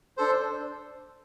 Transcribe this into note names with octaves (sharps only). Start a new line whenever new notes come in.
D4 A4 C5